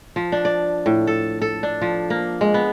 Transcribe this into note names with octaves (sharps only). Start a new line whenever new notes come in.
F3
D4
D5
A2
A4
A4
D4
F3
A#3
G#3
B3